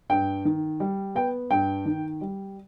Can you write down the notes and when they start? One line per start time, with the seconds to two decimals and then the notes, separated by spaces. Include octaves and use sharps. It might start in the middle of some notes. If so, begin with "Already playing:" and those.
0.10 G2 G5
0.45 D#3
0.80 G3
1.15 B3 G5
1.51 G2 G5
1.86 D#3
2.21 G3